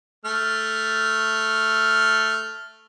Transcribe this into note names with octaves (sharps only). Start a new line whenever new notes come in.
A3 F6